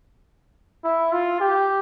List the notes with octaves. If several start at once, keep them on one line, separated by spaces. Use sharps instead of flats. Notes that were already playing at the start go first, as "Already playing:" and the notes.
E4
F4
G4